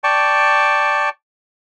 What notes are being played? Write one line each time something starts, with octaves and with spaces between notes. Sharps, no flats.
D5 G5 A5 C#6